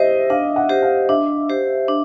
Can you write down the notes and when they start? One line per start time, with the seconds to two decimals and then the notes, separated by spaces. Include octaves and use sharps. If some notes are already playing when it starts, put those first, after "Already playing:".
Already playing: G4 C5 D#5 E5
0.30 D4 F5
0.56 F#5
0.70 G4 C5
0.82 F5
1.09 D4 E5
1.49 G4 C5
1.88 D4